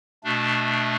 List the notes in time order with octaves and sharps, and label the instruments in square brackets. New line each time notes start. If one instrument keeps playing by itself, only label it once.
[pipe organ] B2 A3 D4